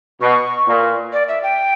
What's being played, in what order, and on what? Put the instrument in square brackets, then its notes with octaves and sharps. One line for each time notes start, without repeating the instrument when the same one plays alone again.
[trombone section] B2 [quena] C#6
[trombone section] A#2
[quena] D5
E5
G5